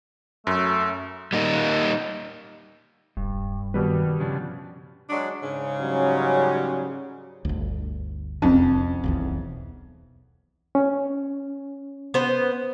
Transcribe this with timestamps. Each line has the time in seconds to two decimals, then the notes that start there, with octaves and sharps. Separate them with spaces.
0.47 F#2 A3
1.33 G3 A#3 D#4
3.17 D#1 G2
3.74 B2 D#3 G3 B4
4.20 C#3 F3 D4
5.10 F#3 G#3 D4
5.42 G#2 C#3
5.80 F#3 G3 C#4
7.45 G1 D2
8.42 E1 C2 F2 C#4
9.04 D#1 B1 E2
10.75 C#4
12.14 B3 C5